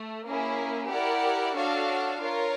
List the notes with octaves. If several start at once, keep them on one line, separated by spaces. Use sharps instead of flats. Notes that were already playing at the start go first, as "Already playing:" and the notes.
Already playing: A3
A#3 C#4 E4 G#4
E4 G4 A#4 D5 F#5
D4 F#4 A4 C#5 F5
F4 A#4 C#5